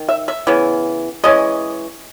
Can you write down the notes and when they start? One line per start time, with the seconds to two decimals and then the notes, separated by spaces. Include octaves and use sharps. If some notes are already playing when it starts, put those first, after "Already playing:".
Already playing: D#3
0.09 E5
0.28 E5
0.47 C#3 E3 B3
1.24 E3 G#3 C#4 D#5